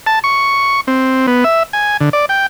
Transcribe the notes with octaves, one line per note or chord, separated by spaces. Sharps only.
A5
C#6
C4
B3
E5
G#5
D3
D5
G5